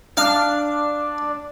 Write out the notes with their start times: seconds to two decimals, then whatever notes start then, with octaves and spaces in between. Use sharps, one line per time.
0.17 D4 F5